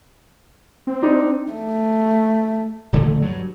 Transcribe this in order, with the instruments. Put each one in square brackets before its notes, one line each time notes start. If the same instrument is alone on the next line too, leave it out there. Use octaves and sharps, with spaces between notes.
[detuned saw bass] C4
[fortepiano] D4 D#4
[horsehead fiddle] A3
[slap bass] D#1 D3 E3 A3
G2 F#3